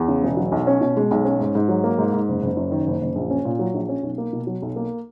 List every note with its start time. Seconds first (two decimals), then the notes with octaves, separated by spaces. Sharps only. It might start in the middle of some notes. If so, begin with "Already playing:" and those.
Already playing: E2
0.08 C#3
0.23 E1
0.37 F#3
0.52 B1
0.67 C#4
0.81 B2
0.97 G#3
1.11 B1
1.25 C#4
1.40 G#2
1.55 G#2
1.69 F#3
1.84 A#3
1.98 G#2
2.13 G#2
2.28 F#1
2.42 F#1
2.57 F#2
2.71 D#3
2.87 F#1
3.01 F#1
3.15 A#1
3.30 C#4
3.45 A#2
3.59 F#3
3.74 A#1
3.89 C#4
4.03 B1
4.18 A#3
4.33 B2
4.47 F#3
4.62 B1
4.76 A#3